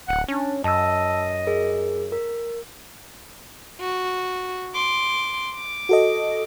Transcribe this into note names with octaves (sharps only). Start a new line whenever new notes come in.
D1 F#5
C#4 D4
F#2 D#5 A5 E6
G#4 A#4
A#4
F#4
C6 D6
D6
F#4 A4 D#5